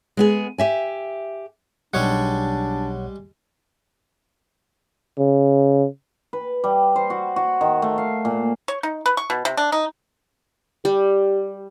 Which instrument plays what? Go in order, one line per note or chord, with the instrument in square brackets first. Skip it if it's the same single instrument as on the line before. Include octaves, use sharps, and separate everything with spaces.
[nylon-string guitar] G#3 B3 G#4
G4 E5 G#5
[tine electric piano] B1 C#5 F#5 [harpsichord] G3 G#3 [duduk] D4
[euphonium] C#3
[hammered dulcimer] B4
G3
C5
F#4
F#4
D#3
A3
F5
A#2
[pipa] C#5
D#4
B4
C#6
B2
C3
D4
D#4
[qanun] G3 [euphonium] G4